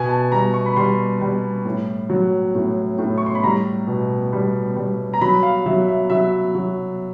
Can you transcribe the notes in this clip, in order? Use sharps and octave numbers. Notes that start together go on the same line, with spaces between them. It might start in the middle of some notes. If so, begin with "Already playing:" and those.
Already playing: B2 G#5
A5
G3 A#5
C#6
B5
G3 C6
G3
A2
F#3
A2
A2
C#6
C6
B5
G3 A#5
B2
G3
G3
A#5
F#3 B5
F5
F#3 E5
E5
F#3 E5
F#3